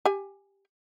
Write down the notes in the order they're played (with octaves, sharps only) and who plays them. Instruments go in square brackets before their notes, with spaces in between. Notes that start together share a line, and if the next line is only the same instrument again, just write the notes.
[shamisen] G4 G#5